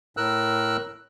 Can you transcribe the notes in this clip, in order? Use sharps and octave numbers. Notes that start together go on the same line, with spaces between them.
A2 A#4 E6 F#6